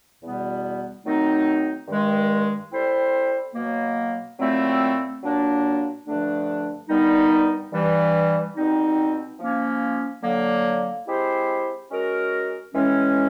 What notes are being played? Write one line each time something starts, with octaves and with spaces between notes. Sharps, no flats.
E2 B2 G3 B3
D#3 F#3 A3 C4 D#4
G2 D#3 G#3
G3 C4 E4 A4 C5
B2 F#3 A#3
A#2 F#3 A3 C4 E4
A#2 F#3 A#3 D4
G2 D3 F3 A3 D4
G2 D#3 G3 B3 D#4
G2 E3 G3
B2 G3 C4 D#4
F3 A#3 C#4
D3 F#3 A#3
G#3 C4 E4 G4 C5
G#3 C#4 F#4 A#4
A2 E3 G#3 C#4